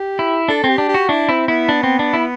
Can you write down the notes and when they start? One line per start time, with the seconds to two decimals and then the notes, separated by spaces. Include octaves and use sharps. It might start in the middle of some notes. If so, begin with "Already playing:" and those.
Already playing: G4
0.19 E4
0.48 D4 A4
0.64 C4
0.69 G4
0.78 D4
0.88 G4
0.94 F#4
1.09 D4 E4
1.29 C4 E4
1.48 B3 E4
1.69 D4
1.83 C4
1.99 D4
2.13 E4